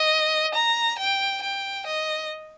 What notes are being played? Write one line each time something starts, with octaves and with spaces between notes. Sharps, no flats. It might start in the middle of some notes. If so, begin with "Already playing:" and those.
Already playing: D#5
A#5
G5
G5
D#5